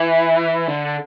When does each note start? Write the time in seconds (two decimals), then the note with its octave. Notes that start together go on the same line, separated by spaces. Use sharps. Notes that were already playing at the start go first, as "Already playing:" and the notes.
Already playing: E3
0.68 D3